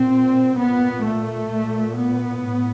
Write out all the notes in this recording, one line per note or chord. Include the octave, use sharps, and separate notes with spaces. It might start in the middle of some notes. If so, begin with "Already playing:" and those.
Already playing: A#2 C4
A#2 B3
A3
A#2
B3
A2